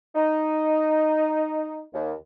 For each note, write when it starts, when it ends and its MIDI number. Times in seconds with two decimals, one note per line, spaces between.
0.15 1.82 63
1.94 2.12 39